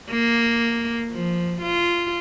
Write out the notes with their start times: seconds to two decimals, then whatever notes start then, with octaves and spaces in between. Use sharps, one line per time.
0.10 A#3
1.11 F3
1.61 F4